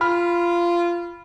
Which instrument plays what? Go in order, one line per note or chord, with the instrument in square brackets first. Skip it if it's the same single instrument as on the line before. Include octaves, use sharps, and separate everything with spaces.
[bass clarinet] F4 [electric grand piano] B5 F6